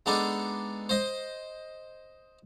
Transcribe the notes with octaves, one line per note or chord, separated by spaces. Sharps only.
G#3 B3 D4 D#4 A4
C5 D#5